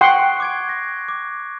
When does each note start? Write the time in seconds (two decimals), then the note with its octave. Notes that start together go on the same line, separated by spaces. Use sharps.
0.01 F#5 G5 C6 C#6 F#6 C7
0.40 D6 G#6 D7
0.69 A#6
1.08 D6